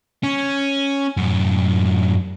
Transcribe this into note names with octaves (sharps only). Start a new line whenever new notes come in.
C#4
F#2 A2